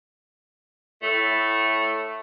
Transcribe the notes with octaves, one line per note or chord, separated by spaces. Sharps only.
A2 A3